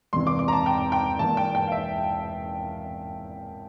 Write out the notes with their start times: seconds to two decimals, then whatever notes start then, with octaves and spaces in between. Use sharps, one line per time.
0.13 E1 E2 C3 E3 C6
0.27 D6
0.39 D6
0.48 A#5
0.53 A5
0.66 G5
0.92 G5
1.19 E1 E2 E3 A#3 A5
1.37 G5
1.55 G5
1.67 F5
1.72 E5